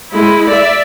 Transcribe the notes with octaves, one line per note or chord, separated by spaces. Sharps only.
G#3 E4
D5 E5